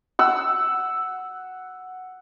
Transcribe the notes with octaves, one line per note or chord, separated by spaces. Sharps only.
F#5 E6